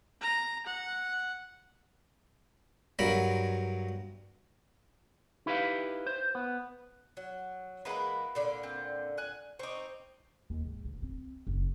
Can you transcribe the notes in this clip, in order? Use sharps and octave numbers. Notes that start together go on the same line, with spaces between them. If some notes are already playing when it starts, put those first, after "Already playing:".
A#5
F#5
G2 F#3 A#4 B5
D#4 E4 G4 B4 C5 F5
C5
B3
F#3
E3 G#3 A#3 B4 F#5 B5
A#2 D3 D5
C4
G#5 F#6
C4 D#4 C#6 D6
D#2
G#2
D2
C4
F#1